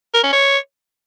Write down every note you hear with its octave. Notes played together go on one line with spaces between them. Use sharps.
A#4
C#4
C#5